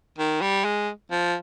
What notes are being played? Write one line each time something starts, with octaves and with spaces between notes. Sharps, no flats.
D#3
G3
G#3
F3